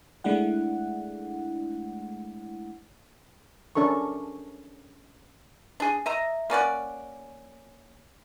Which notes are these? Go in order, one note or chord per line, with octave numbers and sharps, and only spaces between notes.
G#3 A3 D4 E4 F#5
C#4 D4 A4 A#4 C#6
D4 G#4
D#5 E5 A#5
A#3 C#4 D5 F#5